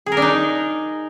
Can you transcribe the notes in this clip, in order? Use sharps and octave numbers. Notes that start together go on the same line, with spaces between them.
G#4
A#4
D4
D#4